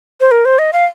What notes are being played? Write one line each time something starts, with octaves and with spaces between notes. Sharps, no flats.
C5
A#4
C5
D#5
F5